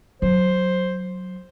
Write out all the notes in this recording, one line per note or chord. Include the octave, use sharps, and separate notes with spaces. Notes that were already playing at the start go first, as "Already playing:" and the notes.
F#3 C5